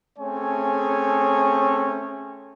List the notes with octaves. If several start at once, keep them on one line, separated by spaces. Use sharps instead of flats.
A3 C4 C#4 G#4 C#5 G#5